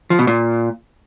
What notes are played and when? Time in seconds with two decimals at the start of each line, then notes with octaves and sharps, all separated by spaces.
0.10 F3
0.19 B2
0.27 A#2